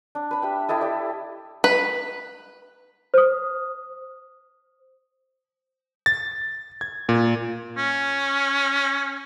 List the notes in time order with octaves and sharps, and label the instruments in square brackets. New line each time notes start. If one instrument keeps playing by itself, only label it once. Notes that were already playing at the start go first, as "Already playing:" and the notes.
[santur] D4
B4 B5
G4 E5 G5
E4 G4 A4 D#5
D5 G5
[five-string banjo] B4
[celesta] C5 D#6
[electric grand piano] A6
G#6
A#2
[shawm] C#4